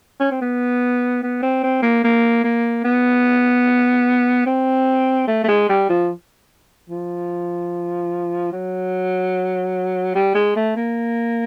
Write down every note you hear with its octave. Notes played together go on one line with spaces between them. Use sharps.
C#4
C4
B3
B3
C4
C4
A#3
A#3
A#3
B3
C4
A3
A3
G#3
G3
F3
F3
F#3
G3
G#3
A3
A#3